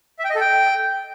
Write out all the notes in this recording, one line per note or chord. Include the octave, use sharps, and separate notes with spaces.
E5
G5
D#5
A4
G5